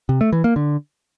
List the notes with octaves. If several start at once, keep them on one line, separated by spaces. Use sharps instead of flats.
C3
A3
E3
A#3
D3